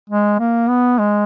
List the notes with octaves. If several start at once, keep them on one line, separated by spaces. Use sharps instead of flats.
G#3
A#3
B3
G#3